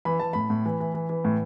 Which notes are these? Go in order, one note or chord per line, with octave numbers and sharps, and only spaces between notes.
E3 B5
E3 A5
A2 B5
A2
E3
E3
E3
E3
A2